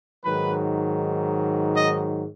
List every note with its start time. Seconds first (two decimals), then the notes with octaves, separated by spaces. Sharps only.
0.25 G#2 D#3 F#3 B4
1.75 D#5